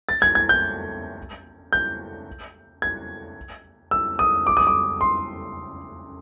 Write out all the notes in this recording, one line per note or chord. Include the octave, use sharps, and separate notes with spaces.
A6
G#6
G#6
G6
G6
G#6
E6
D#6
D6
D#6
D6
C6